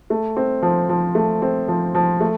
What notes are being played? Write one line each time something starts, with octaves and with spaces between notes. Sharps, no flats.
A3
C4
F3
F3
A3
C4
F3
F3
A3